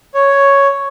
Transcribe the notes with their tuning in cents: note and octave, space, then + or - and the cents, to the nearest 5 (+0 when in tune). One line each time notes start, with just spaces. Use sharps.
C#5 +0